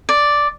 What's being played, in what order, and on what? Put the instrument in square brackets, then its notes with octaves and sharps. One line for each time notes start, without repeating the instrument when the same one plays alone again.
[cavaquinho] D5